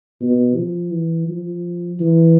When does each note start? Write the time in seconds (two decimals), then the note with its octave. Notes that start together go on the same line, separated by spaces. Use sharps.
0.21 B2
0.56 F3
0.92 E3
1.29 F3
2.00 E3